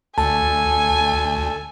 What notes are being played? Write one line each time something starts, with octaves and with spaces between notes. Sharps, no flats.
D2 A4 G#5 A5